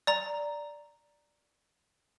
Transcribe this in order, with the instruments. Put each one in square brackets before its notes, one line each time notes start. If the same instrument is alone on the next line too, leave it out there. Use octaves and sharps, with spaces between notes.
[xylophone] D5 A#5